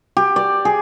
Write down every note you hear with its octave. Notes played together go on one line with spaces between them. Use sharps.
G4
D5
G#4